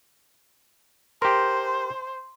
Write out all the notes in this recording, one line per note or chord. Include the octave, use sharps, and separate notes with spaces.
G4 A#4 C5 C6